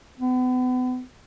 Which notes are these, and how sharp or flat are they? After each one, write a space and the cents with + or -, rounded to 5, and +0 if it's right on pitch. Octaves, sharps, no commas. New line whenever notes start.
B3 +35